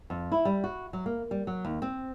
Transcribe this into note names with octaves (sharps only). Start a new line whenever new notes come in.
F2
E4
G3
F#4
F#3
A#3
G3
F#3
D#2
C4